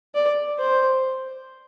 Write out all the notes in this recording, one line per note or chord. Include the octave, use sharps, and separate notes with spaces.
D5
C5